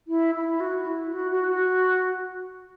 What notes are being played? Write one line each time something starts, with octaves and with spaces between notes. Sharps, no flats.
E4
E4
F#4
E4
F#4
F#4
F#4